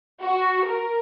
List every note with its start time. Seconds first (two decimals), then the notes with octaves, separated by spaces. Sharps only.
0.21 F#4
0.66 A#4